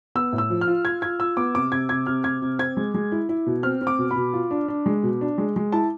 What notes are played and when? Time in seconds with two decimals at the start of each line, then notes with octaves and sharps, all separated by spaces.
0.15 B3 E6
0.33 A2
0.38 E6
0.50 F3
0.61 F6
0.67 F4
0.85 F4 G#6
1.02 F4 G#6
1.19 F4 E6
1.37 B3 D6
1.55 C3 D6
1.72 C3 G#6
1.89 C3 G#6
2.07 C3 F6
2.24 C3 G#6
2.42 C3
2.59 C4 G#6
2.77 G#3
2.94 G#3
3.12 E4
3.29 E4
3.46 B2
3.63 C4 F6
3.81 C4
3.87 D6
3.99 B2
4.11 B5
4.16 B2
4.33 F4
4.51 D4
4.68 D4
4.86 G#3
5.03 B2
5.21 D4
5.38 G#3
5.56 G#3
5.72 E4 A5